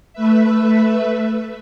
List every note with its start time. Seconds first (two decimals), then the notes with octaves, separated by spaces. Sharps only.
0.13 A3 B4 E5